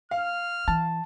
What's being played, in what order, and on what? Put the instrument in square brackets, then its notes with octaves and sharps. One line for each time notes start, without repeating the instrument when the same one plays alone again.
[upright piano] F5 [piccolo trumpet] F6
[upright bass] E3 [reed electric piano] A5